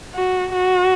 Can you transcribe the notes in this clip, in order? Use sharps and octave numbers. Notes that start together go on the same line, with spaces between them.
F#4
F#4